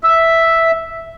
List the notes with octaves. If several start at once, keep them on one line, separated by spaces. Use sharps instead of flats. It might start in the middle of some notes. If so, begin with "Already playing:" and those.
E5